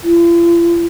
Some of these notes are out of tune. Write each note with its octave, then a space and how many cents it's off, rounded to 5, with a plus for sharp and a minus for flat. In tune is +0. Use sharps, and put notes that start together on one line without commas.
F4 -45